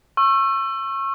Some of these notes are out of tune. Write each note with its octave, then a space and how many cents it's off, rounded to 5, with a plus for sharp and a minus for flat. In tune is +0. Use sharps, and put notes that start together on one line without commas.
C#6 -25 E6 +25